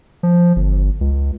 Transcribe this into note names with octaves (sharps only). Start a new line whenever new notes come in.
F3
G1
C#2